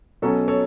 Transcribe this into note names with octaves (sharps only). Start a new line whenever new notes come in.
B2 F#3 C#4 A4
A4 C#5